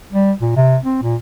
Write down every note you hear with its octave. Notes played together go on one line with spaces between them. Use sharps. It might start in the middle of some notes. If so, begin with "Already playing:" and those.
G3
A#2
C3
C4
A#2